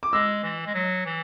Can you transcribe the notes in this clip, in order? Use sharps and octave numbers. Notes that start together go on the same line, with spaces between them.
D6
G#3 E6
E3
G#3
F#3
E3